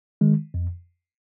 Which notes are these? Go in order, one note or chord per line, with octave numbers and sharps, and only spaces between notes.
D#3 G#3
F2